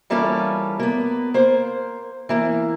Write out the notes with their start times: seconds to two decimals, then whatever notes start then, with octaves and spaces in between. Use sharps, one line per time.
0.10 E3 G3 A#3 C#4 F4 A4
0.80 A#3 B3
1.34 A#3 C5
2.29 E3 A#3